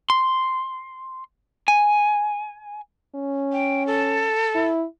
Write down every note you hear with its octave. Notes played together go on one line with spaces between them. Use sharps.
C6
G#5
C#4
G5
A4
E4